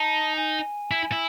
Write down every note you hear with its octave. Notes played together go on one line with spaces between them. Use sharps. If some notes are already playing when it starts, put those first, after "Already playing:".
Already playing: D#4 A5
G#5
E4
E4